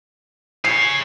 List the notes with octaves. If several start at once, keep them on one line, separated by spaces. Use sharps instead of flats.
G#4 C#5 C7